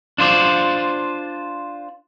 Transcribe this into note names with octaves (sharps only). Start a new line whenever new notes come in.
D4 F4 C5 D5